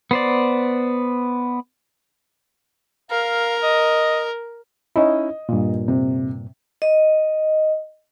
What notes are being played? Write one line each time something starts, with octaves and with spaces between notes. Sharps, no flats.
B3 C5 D5
A#4 F5
D#5
C#4 D#4 E4 D#5
G2 A#2
C3
D#5